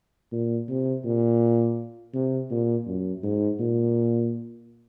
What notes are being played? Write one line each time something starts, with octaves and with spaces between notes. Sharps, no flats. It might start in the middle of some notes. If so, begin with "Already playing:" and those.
A#2
C3
A#2
C3
A#2
F#2
G#2
A#2